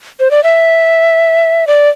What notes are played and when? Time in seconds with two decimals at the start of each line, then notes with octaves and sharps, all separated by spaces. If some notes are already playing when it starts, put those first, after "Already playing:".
0.20 C5
0.31 D5
0.44 E5
1.67 D5